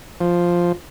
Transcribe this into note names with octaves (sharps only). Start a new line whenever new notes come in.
F3